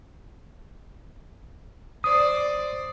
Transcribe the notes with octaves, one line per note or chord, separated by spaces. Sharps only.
C5 D5 D#6